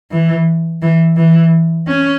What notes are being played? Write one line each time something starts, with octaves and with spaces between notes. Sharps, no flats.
E3
E3
E3
C#4